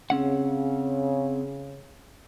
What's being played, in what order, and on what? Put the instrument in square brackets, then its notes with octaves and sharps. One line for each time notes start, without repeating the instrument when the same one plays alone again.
[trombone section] C#3 [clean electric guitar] C4 C#4 F#5